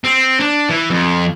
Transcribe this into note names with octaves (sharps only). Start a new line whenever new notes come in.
C4
D4
E3
F2